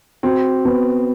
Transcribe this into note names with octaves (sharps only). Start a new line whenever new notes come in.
C4 F#4
B3